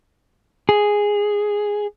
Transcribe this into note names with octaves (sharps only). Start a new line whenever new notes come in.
G#4